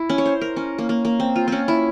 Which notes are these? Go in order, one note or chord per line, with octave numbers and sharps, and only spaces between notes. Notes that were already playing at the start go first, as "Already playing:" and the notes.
Already playing: E4
C#4
C#5
C5
A#4
C#4
A#3
A#3
A#3
C4
F4
C4 C#4
E4